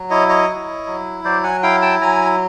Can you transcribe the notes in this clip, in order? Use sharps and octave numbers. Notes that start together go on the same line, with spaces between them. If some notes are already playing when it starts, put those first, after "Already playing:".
Already playing: F#3
E4 C#5 D#5
C#5 D#5
E4
F#3
F#3 C5 D5
F#5 G#5
E4 F5 G5
G5 A5
F#3 G#5 A#5